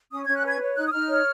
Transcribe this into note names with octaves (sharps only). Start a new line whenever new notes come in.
C#4 D#6
C#4 G#6
F#6
B4 G#6
C#5
D#4 F#6
D#6
D#4 F6
C#5